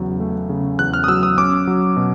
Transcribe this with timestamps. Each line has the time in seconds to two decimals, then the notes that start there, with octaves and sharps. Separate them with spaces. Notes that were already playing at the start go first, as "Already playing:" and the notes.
Already playing: E2 C#3 F#3
0.20 A3
0.49 C#3
0.79 E2 F#6
0.94 F6
1.04 D#6
1.08 F#3 E6
1.23 D#6
1.38 C#4 D6
1.67 F#3
1.97 B2